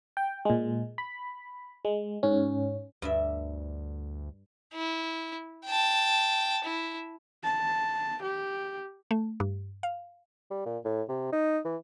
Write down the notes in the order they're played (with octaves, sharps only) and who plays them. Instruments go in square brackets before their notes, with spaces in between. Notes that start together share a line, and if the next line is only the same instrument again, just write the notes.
[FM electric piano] G5
A#2 G#3
B5
G#3
G#2 C#4
[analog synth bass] D2 [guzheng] G2 D4 E5
[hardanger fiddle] E4
G5 A5
E4
[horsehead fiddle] A5
G4
[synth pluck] A3
G2
F5
[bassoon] G3
A#2
A2
C3
D#4
E3